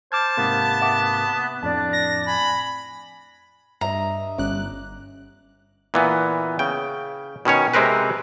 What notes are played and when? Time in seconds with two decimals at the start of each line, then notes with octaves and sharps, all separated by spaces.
0.12 C5 A5 D6 F6 G#6
0.38 G#2 C3 A#3 B3
0.81 E5 F#5 D6
1.63 F2 A2 D4 D5 A5
1.93 A#6
2.26 G#5 B5
3.81 G2 D#5 E5 A#5
4.38 G1 G3 C#4 D6 F#6
5.94 A#2 E3 B3
6.59 C#3 G5
7.45 B2 D#3 C#4 C#5
7.74 C3 G#3 C4 A#4 B4